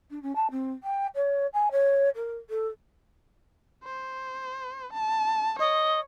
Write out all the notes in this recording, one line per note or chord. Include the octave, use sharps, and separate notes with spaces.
D4
C#4
A5
C4
G5
C#5
G#5
C#5
A#4
A4
C5
A5
C#5 D#5